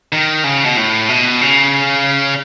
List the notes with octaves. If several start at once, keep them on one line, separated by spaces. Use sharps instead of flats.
D#3
C#3
B2
A2
B2
C#3